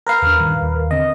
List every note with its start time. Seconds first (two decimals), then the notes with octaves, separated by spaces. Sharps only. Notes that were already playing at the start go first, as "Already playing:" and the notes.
0.07 A#4 B4 F5
0.22 E2 D4
0.37 G2 A#2 D#3
0.62 D#2
0.91 D3 C4 D#5